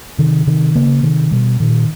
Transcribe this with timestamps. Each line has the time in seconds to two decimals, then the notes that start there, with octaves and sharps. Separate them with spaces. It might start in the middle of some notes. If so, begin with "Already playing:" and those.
0.19 C3 D#3
0.47 C3 D#3
0.75 C#3 A#3
1.03 C3 D#3
1.31 B2 G3
1.60 A#2 D#3